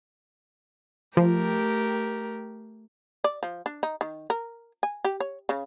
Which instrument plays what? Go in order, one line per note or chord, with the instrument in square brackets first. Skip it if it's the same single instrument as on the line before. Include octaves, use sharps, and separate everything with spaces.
[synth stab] F3 [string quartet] A3 G4 A#4
[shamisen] D5
F3
D4
D#4
D#3
A#4
G#5
G4
C#5
C#3